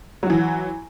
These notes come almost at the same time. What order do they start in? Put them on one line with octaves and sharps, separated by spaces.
F#3 F#4 E3